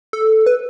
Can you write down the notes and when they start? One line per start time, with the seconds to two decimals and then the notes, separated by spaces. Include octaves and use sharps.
0.13 A4
0.46 B4